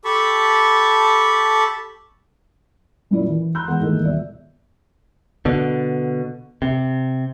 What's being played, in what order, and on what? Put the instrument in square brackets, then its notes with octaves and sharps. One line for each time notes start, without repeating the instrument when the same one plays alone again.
[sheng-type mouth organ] G4 A4 A5 B5 C#6
[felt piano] F#2 A#2 E4 D5
E3
A#5 C6 E6 F#6 G6
E2 G#3 B3 F#5
G#2 D#3 E3 A3 A#3
D#1 B2 D5 E5
[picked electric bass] B2 D3
C3